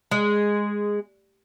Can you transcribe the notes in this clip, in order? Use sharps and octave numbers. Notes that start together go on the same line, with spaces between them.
G#3